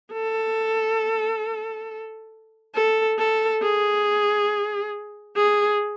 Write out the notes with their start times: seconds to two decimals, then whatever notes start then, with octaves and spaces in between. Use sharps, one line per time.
0.12 A4
2.75 A4
3.18 A4
3.62 G#4
5.36 G#4